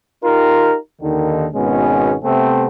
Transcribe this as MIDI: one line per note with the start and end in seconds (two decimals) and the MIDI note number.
0.23 0.75 63
0.23 0.75 65
0.23 0.75 67
0.23 0.75 70
1.01 1.46 39
1.01 1.46 50
1.01 1.46 51
1.53 2.15 32
1.53 2.15 47
1.53 2.15 56
1.53 2.15 59
1.53 2.15 61
2.23 2.68 48
2.23 2.68 57
2.23 2.68 59
2.23 2.68 60